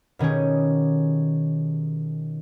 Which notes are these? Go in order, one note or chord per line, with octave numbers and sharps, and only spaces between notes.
B2 D#3 C#4 G4 G#4